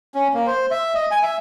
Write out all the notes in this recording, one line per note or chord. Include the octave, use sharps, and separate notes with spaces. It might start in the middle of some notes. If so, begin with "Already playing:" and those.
C#4
A#3
C5
E5
D#5
G#5
E5